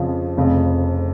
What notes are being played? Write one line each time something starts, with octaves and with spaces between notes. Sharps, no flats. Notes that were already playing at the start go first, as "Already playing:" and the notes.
Already playing: F2 C#3 F3
F1 F2 C#3